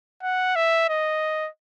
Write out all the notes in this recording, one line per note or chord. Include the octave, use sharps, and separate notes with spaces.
F#5
E5
D#5